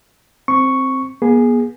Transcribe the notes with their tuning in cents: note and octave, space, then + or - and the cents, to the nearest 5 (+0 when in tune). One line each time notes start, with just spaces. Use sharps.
C4 +5 C#6 +0
B3 -45 G#4 +0